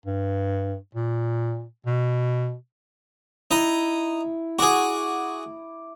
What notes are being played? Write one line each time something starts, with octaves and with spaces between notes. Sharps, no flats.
G2
A#2
B2
D#4 E4 D#5
F#4 G#4 D6